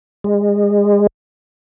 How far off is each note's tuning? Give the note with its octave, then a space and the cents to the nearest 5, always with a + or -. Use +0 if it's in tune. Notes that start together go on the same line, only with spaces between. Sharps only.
G#3 -30